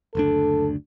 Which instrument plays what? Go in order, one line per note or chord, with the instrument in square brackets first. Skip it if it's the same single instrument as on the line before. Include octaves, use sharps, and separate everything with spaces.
[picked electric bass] F#1 D2 D4 [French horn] A4